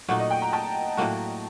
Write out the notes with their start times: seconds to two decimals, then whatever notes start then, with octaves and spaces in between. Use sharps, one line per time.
0.08 A#2 F#3 A3 D#4 F#5
0.20 D#5
0.31 G5
0.42 A#5
0.53 A5
0.97 A2 F#3 A#3 F#4